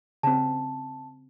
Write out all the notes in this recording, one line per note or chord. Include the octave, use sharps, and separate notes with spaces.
C#3 C4 A5